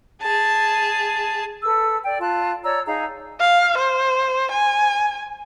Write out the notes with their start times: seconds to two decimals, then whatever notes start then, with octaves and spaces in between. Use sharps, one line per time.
0.22 G#4 A5
1.63 A4 B4 E6
2.04 D5 G5
2.20 F4 A5 F#6
2.63 C#5 D5 A#5 E6
2.86 D#4 G#4 F5 A#5
3.40 F5
3.77 C5
4.51 G#5